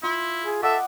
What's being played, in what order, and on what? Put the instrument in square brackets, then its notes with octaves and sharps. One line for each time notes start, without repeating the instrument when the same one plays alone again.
[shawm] E4 [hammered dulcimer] F4
[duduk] G#4
[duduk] A4 [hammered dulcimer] D#5 F#5 D6 [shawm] E5